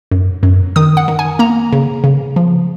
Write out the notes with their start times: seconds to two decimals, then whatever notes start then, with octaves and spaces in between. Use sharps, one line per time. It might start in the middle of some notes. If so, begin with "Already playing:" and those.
0.11 F#2
0.43 F#2
0.76 D#3 D#6
0.97 F#5
1.08 D#3
1.19 G#5
1.39 A#3 A#5
1.73 C#3
2.04 C#3
2.36 F3